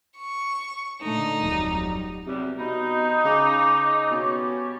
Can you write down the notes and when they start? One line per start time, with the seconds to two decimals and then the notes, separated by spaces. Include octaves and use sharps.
0.18 C#6
1.02 A#2 D3 A3 D#4
1.43 D1 F2 F#3 G3
2.26 E2 C3 F#3 G3
2.59 B2 D#4 B5
3.25 C#3 D6
4.11 B2 G3 C#4